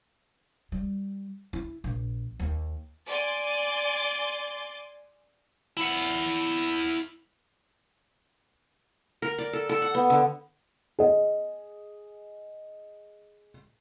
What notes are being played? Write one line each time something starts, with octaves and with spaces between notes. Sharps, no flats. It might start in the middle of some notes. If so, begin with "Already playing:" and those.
G3
E4
A#1
D#2
D5 G#5 C6 A6
E4 F#5
A#4
D5
A4
A4
F#5
B3
D3
G#4 D#5